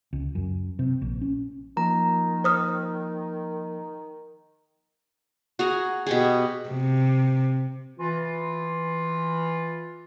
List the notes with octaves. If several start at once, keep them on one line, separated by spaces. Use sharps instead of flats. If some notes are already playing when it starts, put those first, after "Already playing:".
C#2
F#2
C3
A#1
C#4
D#3 F3 A#3 A#5
C5 D#6 F6
F#4 G#4 A#5
B2 G4 G#4
C3
E3 F4